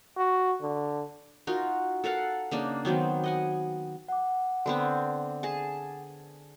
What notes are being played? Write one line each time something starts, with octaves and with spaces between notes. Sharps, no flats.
F#4
D3
D#4 F4 F#4 A#4
A4 A#4 F5 F#5
C#3 A#3 D4 D#4
D#3 F#3 B3 C4
D#5 F#5 G#5
F#5 D6
D3 B3 C4
G#4 A5